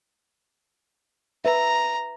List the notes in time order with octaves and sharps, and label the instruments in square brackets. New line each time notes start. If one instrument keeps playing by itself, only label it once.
[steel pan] B4 E5 [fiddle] A#5